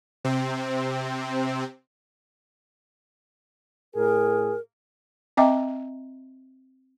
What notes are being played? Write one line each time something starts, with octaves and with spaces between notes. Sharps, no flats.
C3 C4
A2 G#4 A#4
C4 D#5 E5 G5 A#5 D6